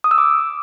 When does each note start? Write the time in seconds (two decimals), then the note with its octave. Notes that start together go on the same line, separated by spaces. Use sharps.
0.04 D#6
0.11 E6
0.18 D6